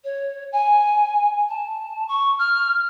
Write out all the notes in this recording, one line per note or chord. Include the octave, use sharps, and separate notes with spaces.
C#5
G#5
A5
C#6
F6